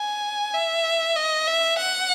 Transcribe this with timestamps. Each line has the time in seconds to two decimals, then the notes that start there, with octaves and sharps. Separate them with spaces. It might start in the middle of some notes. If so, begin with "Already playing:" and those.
Already playing: G#5
0.54 E5
1.16 D#5
1.47 E5
1.78 F#5